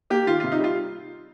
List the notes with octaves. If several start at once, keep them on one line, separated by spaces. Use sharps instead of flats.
A#3 G4
D#3 F4
C3 F4
D#4
G3 F4